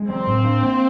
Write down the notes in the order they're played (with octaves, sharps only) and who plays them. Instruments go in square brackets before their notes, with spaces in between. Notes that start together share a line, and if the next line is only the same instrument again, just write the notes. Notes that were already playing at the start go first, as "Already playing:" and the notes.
Already playing: [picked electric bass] G#3
[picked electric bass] F#3 [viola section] C4
[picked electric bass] A2
D4
A#3